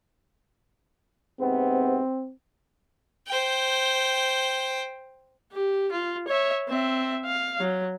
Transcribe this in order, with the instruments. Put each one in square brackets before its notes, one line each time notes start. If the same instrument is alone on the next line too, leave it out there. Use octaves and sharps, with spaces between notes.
[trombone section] G#2 C3 B3 [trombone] C4
[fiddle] C5 G5
[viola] G4
F4
C#5 E5
C4 E5
F5
F#3